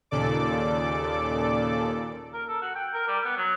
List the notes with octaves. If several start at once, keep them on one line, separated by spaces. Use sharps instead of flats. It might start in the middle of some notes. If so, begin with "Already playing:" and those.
D#2 A#2 C#3 A4 D5 D6
A#4
A4
F#4
G5
A#4
G3
B3
F#3